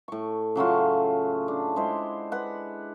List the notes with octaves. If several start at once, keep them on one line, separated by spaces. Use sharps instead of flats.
A2 C#6
C#3 F#3 A3 F4
D4
G#3 E4 C5
B4 F#5